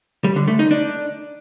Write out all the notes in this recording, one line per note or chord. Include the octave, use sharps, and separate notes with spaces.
G3
D3
A3
D#4
D4